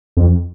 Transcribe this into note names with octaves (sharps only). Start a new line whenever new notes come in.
F2